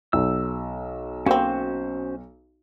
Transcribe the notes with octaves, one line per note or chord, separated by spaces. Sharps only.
B1 E6
A#3 C4 C#4 F#4 C5